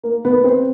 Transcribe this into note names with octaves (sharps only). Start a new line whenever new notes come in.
A#3 A#4
B3 B4
C4 C5